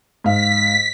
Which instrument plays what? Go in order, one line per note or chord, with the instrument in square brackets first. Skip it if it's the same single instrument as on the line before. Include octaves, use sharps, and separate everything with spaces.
[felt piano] G#2 F5 [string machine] B6